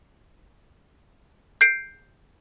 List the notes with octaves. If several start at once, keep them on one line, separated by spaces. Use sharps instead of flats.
G6 C7 D7